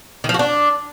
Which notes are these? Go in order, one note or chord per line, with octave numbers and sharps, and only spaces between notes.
D#3
F3
F#4
D4